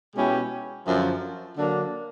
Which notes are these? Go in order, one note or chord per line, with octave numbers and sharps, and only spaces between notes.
B2 G#3 C#4 E4 G4
F#2 D3 F3
D3 F#3 A#3 D4